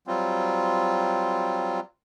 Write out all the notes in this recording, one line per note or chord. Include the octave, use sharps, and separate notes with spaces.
F#3 G3 C4 F4